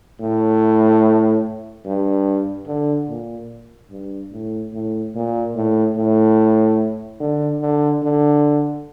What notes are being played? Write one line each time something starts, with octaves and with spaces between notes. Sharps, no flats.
A2
G2
D3
A#2
G2
A2
A2
A#2
A2
A2
D3
D3
D3